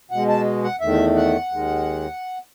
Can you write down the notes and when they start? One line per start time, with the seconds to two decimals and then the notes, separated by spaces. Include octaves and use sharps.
0.11 B2 G#3 F#5
0.29 A5
0.64 F#5
0.81 E2 D#3 A3 E5
1.16 F#5
1.51 D#2 D#3 G#3